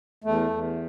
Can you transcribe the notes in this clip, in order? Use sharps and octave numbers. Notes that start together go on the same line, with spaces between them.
E2 A3
E2